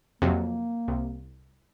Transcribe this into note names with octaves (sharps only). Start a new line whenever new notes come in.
F2 C3 F#3 A#3
C2